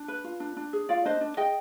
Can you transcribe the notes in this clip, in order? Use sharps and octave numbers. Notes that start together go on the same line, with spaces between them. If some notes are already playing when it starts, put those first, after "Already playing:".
Already playing: D4
B4
F4
D4
D4
G#4
F4 D5 F5
D4 C5 D#5
D4
G#4 D#5 G5